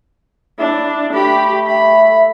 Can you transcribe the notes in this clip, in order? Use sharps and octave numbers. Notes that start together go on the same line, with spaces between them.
D4 E4
A3 G4 B5
E5 B5